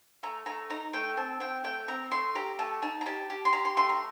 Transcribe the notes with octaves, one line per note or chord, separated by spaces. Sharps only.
A3 A#5
A3 A#5
D#4 A#5
A3 G5
C4 A5
C4 G5
A3 G5
C4 A#5
A3 C6
G4 A#5
A3 A5
D#4 A5
A#5
G4 A5
G4
C6
G4 A#5
C6
A3 C6
A#5